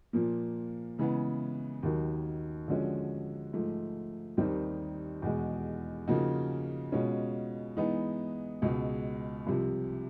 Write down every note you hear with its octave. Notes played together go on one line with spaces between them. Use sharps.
A#2 F3 A#3
C#3 E3 G#3 B3
D#2 D#3 F#3
D3 F3 G#3 C#4 F#4
G#2 F3 A3
D#2 D#3 G3 C4 D#4
E2 B2 G#3
C#3 F3 A#3 D#4 F#4
B2 G#3 C#4 F4
E3 G#3 B3 D#4
C#2 B2 G#3
C2 C3 F3